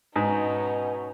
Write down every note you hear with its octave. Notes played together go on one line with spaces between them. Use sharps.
G#2 B2 C#4 D#4